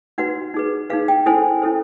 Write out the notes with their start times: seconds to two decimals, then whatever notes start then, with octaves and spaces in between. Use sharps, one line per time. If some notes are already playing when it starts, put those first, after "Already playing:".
0.18 D#4 F#4 B4 F#5
0.54 D#4 G#4 B4
0.90 D#4 G#4 B4 F5
1.08 G5
1.26 C#4 E4 A4 C5 G#5
1.62 C#4 E4 A4 C5